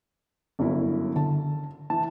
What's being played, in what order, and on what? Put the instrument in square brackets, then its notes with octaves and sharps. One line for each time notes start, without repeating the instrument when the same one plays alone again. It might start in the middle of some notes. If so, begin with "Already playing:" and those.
[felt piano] G1 F#2 E4
[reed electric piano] D3 [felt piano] A5
[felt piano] E3 [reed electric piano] A5